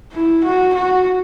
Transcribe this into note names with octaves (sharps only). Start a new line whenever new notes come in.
E4
F#4
F#4